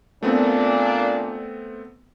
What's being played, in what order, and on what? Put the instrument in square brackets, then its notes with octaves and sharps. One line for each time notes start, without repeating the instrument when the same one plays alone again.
[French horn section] A#2 D4 [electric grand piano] A3 B3 C4